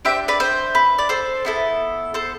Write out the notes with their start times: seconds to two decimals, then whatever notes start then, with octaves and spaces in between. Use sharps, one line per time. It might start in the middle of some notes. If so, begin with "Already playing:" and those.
0.05 D4 G4 C5 E5
0.28 B4 D5
0.40 C5 E5
0.75 B4
0.98 D5
1.09 A4 C5
1.45 B3 E4 A4
2.14 A4 C5